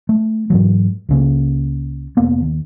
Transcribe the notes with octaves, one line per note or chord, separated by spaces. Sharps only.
A3
G#2 E3 F#3
C#2 C#3 A#3
F1 A#3 B3
D#2